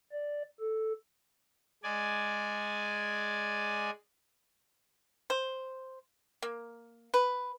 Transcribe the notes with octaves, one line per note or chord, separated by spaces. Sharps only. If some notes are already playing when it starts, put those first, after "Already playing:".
D5
A4
G#3 D5 G#5
C5
A#3
B4